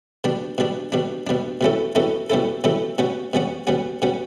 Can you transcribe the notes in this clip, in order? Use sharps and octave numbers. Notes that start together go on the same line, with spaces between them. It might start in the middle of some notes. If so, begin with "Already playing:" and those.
B2 G3 D4
B2 G3 D4
B2 G3 D4
B2 G3 D4
B2 G3 C#4 E4 A4
B2 G3 C#4 E4 A4
B2 G3 C#4 E4 A4
B2 G3 C#4 E4 A4
B2 G3 C#4 F#4
B2 G3 C#4 F#4
B2 G3 C#4 F#4
B2 G3 C#4 F#4